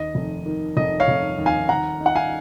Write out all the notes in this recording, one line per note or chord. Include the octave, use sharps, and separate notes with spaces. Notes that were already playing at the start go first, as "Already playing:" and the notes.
Already playing: D#2 D#5
F1
D#3
F1 D#5
C#5 F5
F1
D#2
F5 G#5
D#2 F#5 A#5
D#4
F#5
F5 G#5